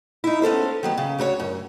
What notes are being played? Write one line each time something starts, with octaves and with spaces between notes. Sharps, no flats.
D#4 E4
B3 C#4 A4 C5
D#3 F#3 B3
C#3
D2 F#4 A#4 C#5
F#2